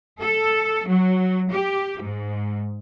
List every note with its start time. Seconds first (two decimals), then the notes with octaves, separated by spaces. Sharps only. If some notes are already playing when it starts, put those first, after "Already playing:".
0.20 A4
0.86 F#3
1.52 G4
2.01 G#2